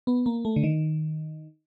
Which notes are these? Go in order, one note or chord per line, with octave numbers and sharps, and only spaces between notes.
B3
A#3
A3
D3
D#3